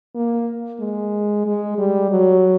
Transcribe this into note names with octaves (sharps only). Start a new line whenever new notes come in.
A#3
G#3
G#3
G3
F#3